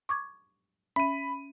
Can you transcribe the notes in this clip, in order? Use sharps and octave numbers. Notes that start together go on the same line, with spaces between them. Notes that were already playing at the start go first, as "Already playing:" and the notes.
C#6 D6 G#6
C#4 E5 B5 D#7